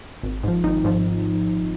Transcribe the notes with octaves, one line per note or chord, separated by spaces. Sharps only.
G#1
G#2 F3
G#1 D#4
G#2 F3